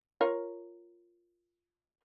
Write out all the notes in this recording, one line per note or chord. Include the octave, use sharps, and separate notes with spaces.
F4 A#4 C#5